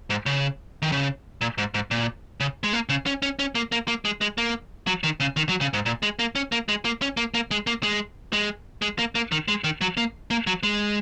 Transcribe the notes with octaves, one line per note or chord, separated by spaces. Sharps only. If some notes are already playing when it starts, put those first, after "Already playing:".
G#2
C#3
D#3
C#3
A#2
G#2
G#2
A#2
C#3
G#3
A#3
C#3
C#4
C#4
C#4
A#3
A#3
A#3
G#3
G#3
A#3
F#3
D#3
C#3
D#3
F#3
C#3
G#2
A#2
G#3
A#3
C#4
A#3
G#3
A#3
C#4
A#3
A#3
G#3
A#3
G#3
G#3
G#3
A#3
A#3
D#3
G#3
D#3
F#3
A#3
A#3
F#3
G#3